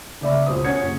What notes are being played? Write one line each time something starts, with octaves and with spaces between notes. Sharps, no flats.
C#3 A#3 D5 E5 B5
C#2 B2 C5 D#6
C#4 C#5 F#5 G#6 C#7
F#1